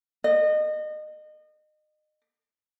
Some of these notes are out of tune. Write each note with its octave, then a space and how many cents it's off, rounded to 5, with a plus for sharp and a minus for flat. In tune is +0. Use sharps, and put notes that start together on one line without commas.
D#5 -30